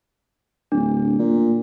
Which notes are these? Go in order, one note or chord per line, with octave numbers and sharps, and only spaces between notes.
D1 D4
A#2